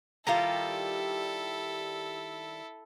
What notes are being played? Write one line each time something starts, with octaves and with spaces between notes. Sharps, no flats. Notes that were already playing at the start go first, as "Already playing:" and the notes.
D#3 G3 E4 F4 G4 A4 A#5